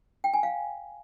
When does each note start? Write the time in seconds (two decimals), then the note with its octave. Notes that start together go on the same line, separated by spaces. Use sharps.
0.24 G5
0.34 G#5
0.43 F5